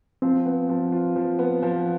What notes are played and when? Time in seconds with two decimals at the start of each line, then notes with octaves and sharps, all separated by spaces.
0.22 F3 C4
0.46 B3
0.69 F3
0.92 F4
1.16 F3
1.39 B3
1.63 F3